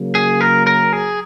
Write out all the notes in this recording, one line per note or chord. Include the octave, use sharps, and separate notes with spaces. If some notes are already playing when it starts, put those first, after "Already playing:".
Already playing: C#3 F#3 A#3
G#4
A#4
A#4
G#4